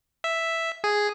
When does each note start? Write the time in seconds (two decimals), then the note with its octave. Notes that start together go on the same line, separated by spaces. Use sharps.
0.24 E5
0.84 G#4